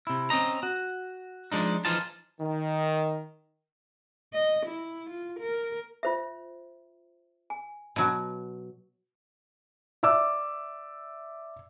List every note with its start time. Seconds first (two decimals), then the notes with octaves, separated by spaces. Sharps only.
0.07 C3 E4
0.30 C4 C#4 D#5 A#5
0.63 F#4
1.52 F3 G#3 D4 D#4
1.85 E3 F3 D#4 F4 G#4 A5
2.41 D#3
4.34 D#5
4.66 E4
5.10 F4
5.40 A#4
6.03 F4 C5 E5
7.50 G#5
7.96 B2 F#3
10.03 D5 E5 D6 E6